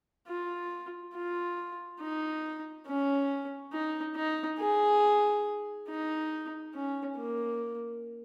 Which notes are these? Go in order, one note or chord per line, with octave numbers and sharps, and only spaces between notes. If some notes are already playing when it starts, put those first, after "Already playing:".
F4
F4
D#4
C#4
D#4
D#4
G#4
D#4
C#4
A#3